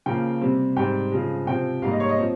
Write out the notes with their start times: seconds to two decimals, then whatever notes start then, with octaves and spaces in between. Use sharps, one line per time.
0.06 C#3 F3 A#3 G5
0.41 C3 G3 C4
0.76 G#2 G3 C4 G5
1.12 C#3 F3 G#3
1.46 C3 F3 C4 G5
1.82 G#2 G3 A#3 F5
1.91 D#5
2.00 C#5
2.09 D#5
2.18 F3 C4